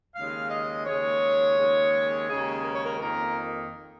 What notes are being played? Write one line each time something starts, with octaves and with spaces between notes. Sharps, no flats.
D#2 C#3 G#3 F5
D#5
D#2 C#3 G#3 C#5
D#2 C#3 G#3
D#2 C#3 G#3 G#4
A#4
C#5
A#4
F2 D#3 A#3 A#4